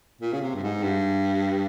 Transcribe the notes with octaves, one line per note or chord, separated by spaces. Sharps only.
A#2
C#3
C3
G2
G#2
G2